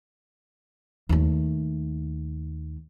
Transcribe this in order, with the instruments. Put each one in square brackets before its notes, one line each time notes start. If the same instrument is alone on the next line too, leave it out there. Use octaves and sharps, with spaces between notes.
[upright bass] D#2 A3